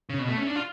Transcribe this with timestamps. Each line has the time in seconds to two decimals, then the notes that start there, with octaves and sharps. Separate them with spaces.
0.10 C#3
0.19 B2
0.28 A3
0.38 C#4
0.47 D4
0.56 F4